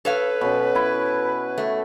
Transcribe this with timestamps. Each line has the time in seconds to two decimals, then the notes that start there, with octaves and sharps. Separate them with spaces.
0.05 A4 B4 C#5 F5
0.41 B2 C#4
0.75 E4 B5
1.58 A3